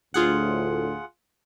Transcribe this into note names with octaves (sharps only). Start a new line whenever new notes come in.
D2 A2 F4 G#4 F#5